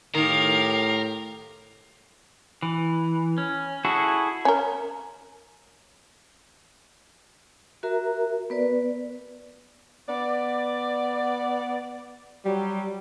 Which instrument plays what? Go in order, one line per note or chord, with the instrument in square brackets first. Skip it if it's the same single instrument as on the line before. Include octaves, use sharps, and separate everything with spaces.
[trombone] A2 [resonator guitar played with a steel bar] D#3 [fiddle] G4 F5 [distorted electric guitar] A#4
[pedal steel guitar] E3
C#4
E4 F#4 G#4 A4
[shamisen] C#4 A#4
[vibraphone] F#4 A#4 E5 A#5
B3 B4 D5
[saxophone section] B3 D5
F#3 G3